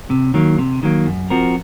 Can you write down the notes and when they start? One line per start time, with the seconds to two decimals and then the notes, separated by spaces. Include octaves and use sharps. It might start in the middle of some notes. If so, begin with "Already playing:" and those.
0.10 C3
0.34 D#3 F#3 A#3
0.58 C3
0.83 D#3 F#3 A#3
1.06 F#2
1.30 F3 C4 F#4 A#4